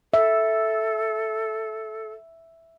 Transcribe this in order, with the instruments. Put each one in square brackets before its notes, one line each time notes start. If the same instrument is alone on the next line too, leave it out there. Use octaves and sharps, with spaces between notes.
[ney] A4 [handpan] E5